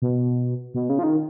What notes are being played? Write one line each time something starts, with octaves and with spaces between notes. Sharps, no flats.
B2
B2
C#3
F3
D#3